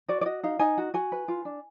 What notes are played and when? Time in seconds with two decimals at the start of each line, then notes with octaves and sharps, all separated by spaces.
0.08 F#4 D5
0.21 D5
0.25 F#4 D#5
0.43 D#4 F5
0.59 D#4 G#5
0.78 F#4
0.94 F#4 G#5
1.12 B4
1.28 F4
1.45 D4